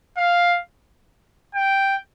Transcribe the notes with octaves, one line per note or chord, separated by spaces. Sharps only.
F5
G5